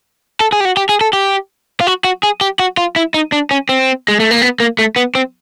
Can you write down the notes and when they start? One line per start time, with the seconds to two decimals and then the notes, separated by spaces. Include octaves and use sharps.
0.40 A4
0.52 G#4
0.60 G4
0.65 F#4
0.77 G4
0.89 G#4
1.01 A4
1.13 G4
1.81 F4
1.87 F#4
2.04 F#4
2.23 G#4
2.41 G4
2.59 F#4
2.77 F4
2.96 E4
3.14 D#4
3.32 D4
3.51 C#4
3.69 C4
4.08 G#3
4.20 A3
4.31 A#3
4.42 B3
4.60 A#3
4.79 A3
4.96 B3
5.15 C4